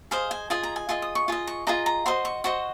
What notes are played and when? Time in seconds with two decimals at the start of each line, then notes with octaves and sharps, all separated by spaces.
0.11 G#4 C5 D#5 F5
0.31 G#5
0.50 F4 G#4 D#5 G#5
0.63 A#5
0.76 G#5
0.89 F4 G#4 D#5 C6
1.02 D#6
1.15 C#6
1.28 F4 G#4 D#5
1.47 C#6
1.67 F4 G#4 D#5 A#5
1.86 A#5
2.06 F#4 C5 D#5 C6
2.25 C#6
2.44 F#4 C5 D#5 C#6